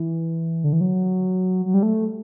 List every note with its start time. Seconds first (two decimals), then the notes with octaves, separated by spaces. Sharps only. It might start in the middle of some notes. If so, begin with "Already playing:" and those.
Already playing: E3
0.64 D3
0.73 E3
0.81 F#3
1.66 F#3
1.74 G3
1.83 A3